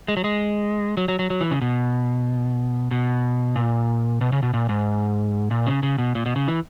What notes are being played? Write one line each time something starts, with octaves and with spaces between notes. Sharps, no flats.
G#3
F#3
G#3
F#3
F#3
F#3
F#3
E3
C#3
B2
B2
A#2
B2
C#3
B2
A#2
G#2
A#2
C#3
C#3
B2
A#2
B2
C#3
E3